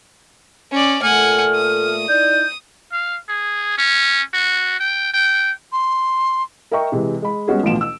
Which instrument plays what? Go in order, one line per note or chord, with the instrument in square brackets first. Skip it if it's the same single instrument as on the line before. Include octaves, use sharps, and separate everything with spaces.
[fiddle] C#4 D5
[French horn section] A#2 A3 [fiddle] F#5 G#5 [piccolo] F6
[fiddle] D#6
[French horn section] D#4 E4 D5 [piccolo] G6
[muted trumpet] F5
G#4
C#4
F#4
G5
G5
[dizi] C6
[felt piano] A#4 D#5 E5 G5 A#5 C#6
C3 E3 G#3
G#3 B5
G3 G#3 B3 C#4 F#4 G#4
A1 D2 B2 F3 D7 E7
E6